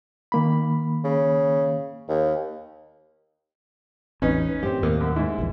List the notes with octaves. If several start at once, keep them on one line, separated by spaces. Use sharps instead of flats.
D#3 A#3 B5
C#3
D#2
A1 E2 C#4 D#4 B4
F#2 A2 C4 G4
D#2 A2 A#3
F#2
G#2 E4
A#1 E2